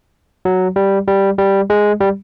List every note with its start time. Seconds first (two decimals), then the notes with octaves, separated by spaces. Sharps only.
0.45 F#3
0.76 G3
1.08 G3
1.38 G3
1.70 G#3
2.00 G3